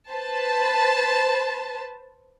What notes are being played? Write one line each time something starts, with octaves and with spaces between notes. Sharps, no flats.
B4 C5 A5